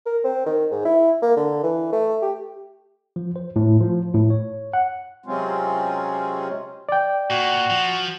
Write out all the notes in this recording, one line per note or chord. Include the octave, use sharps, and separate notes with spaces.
A#4
C4
D#3
G#2
E4
A#3
D3
E3
A3
G4
F3
C5
A2
F3
A2
C#5
F#5
C3 F#3 G#3 C4 C#4 F4
D5 G5
A#2 F#4
F3